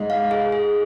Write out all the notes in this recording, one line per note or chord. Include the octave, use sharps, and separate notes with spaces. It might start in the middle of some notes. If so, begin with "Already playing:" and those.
Already playing: G#2 G#3
F5
G#4
G#4